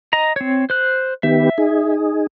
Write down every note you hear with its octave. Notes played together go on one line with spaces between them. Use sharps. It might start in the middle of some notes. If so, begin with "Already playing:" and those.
D#5 A#5
C4 C#5
C5 F#6
D#3 B3 G4 E5
D#4 G#4